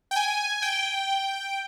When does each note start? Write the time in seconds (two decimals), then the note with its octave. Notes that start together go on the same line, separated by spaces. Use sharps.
0.11 G5
0.16 G#5
0.62 G5